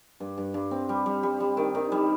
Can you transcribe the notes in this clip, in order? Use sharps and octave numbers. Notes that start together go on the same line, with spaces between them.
G2
G2
G2
C4
G3
G3
G3
G3
D#3
D#3
G3